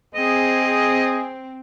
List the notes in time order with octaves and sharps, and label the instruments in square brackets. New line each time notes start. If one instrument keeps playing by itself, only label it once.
[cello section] C4 [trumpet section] G#4 [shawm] D#5